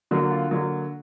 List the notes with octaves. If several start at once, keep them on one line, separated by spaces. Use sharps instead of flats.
D3 F#3 A#3 F#4
F4
D3 F#3 A#3